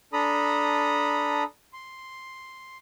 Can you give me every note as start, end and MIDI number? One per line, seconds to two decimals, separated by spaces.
0.13 1.43 62
0.13 1.43 69
0.13 1.43 82
0.13 1.43 83
0.13 1.43 87
1.73 2.78 84